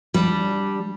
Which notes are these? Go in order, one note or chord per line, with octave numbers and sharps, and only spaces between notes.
G3 D4